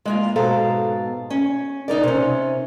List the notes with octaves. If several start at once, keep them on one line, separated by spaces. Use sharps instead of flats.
G#3 A#3 F4
G#2 B2 A4 F5 A#5
C#4
C#3 D#4 A#4 D5
C3 C#4